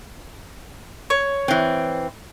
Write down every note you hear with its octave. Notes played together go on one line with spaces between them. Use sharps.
C#5
E3 C4